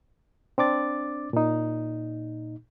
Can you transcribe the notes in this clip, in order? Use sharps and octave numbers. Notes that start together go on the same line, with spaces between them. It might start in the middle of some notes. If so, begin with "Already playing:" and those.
C4 D4 D6 A6
A#2 D#4